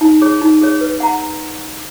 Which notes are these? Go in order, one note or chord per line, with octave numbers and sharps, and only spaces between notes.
D#4
G#4 C#5
D#4
G#4 C#5
B4
F#5 A#5